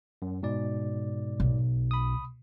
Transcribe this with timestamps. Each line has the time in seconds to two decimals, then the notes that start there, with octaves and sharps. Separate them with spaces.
0.22 F#2
0.43 G#2 B2 D5
1.40 B1
1.91 B5 D#6